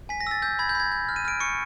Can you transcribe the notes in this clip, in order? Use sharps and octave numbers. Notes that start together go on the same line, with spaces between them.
G#5 B6
A#6
E6 A6
E6 G6
B5 G#6
G6
B5 G#6
G6
F6
D#7
F6 D7
C#6 C#7